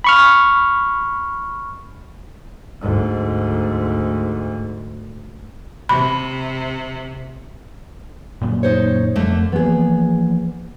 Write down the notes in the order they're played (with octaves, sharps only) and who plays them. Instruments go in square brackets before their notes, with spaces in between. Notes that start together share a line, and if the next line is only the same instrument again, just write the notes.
[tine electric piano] B5 C#6 F6
[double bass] D2 G#2
[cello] C3 [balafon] B5
[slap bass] F#2 A#2 D3
[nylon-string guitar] D#4 C5 C#5
[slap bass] F2 [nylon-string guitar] D3 A3 A#3
[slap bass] E3 F3 A#3 [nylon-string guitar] B3 G#4